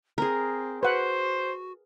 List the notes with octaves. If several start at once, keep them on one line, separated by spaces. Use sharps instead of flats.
C4 G#4 A#4
F#4 B4 C5 F#5